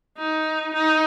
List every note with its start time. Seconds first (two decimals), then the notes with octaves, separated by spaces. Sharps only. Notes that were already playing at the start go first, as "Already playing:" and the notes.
0.18 D#4
0.74 D#4